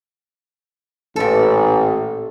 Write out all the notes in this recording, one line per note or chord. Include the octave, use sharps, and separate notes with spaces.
A1 A#2 A4